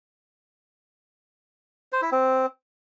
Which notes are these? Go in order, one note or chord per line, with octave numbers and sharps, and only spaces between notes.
C5
E4
C4